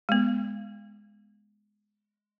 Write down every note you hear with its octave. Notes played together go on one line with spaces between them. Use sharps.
G#3 B3